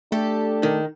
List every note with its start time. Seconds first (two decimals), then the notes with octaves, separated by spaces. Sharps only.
0.12 A3 D4 G4 A4
0.63 D#3